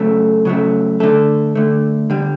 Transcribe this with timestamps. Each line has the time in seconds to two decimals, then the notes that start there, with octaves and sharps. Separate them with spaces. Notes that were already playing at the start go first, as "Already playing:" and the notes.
Already playing: C#3 F#3 A3
0.45 C#3 F#3 A3
1.00 D3 A3 A4
1.55 D3 A3
2.10 D3 G3